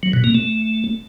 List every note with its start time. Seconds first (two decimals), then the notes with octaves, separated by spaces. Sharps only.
0.03 F#3
0.13 B2
0.24 A#3
0.35 A3